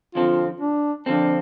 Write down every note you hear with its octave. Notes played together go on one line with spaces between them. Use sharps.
F2 D3 F3 C4 F4 A4
D4
F2 D3 F3 C4 D4 A4